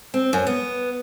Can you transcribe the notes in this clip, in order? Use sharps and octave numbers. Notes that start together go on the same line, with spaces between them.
C4
F#2
B3